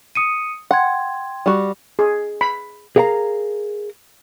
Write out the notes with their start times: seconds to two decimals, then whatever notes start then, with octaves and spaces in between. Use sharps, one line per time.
0.15 D#6 C#7 D#7
0.71 F#5 G5 C6 G#6
1.46 G3 F#4
1.99 G#4
2.41 B5
2.96 G#4 A#4 F5 F#5 A#5